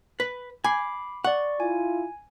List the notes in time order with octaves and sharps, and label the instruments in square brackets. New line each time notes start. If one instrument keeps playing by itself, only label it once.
[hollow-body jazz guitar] B4
[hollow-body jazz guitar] G#5 [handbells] B5 D6 C7
[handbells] D5 C#6 [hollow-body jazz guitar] F#5
[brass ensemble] E4 F4 [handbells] G#5